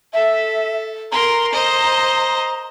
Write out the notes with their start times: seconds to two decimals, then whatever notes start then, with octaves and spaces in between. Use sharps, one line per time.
0.14 A4 E5
1.12 A#4 A#5 C6
1.52 C5 D#5